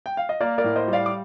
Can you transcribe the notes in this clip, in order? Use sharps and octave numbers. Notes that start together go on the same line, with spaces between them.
G5
F5
D#5
A#3 A#4 D5
A#4 D5
A2
C5 D#5
G3
D5 F5
D6